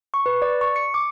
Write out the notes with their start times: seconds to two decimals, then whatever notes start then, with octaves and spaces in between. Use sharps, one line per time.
0.14 C#6
0.26 B4
0.42 D5
0.61 C#6
0.76 C#7
0.94 D6